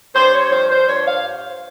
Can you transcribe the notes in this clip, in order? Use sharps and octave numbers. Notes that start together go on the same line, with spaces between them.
G2 C5
C#5
F3 C5
C5
G2 C#5
F5